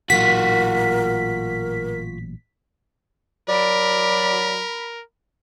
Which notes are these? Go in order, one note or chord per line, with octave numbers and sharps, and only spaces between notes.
A1 A#2 F#3 F4 F#4 A#4 B6
F#3 A#4 D5 B5